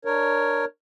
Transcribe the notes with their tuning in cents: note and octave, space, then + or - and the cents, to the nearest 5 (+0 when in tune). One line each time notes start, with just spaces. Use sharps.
D4 +15 A#4 +0 C#5 +0